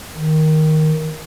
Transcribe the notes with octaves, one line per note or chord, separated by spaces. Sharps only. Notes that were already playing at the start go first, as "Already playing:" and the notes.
D#3